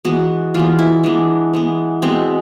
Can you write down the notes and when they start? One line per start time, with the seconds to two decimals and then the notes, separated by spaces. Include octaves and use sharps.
0.05 E3 G#3 B3 F#4
0.54 E3 G#3 B3 F4
0.79 E4
1.03 E3 G#3 B3 D4
1.53 E3 G#3 B3
2.02 B2 G#3 B3 C4